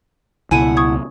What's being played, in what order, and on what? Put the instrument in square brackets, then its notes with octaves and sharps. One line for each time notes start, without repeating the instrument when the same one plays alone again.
[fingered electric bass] C#2 B2 [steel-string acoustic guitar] A3 E4 F#5 [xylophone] G#5 D#7
[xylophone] C#6 D#6 G#6